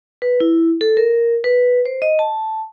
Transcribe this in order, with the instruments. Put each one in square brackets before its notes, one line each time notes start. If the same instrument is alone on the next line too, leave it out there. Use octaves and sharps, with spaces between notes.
[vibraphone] B4
E4
A4
A#4
B4
C5
D#5
A5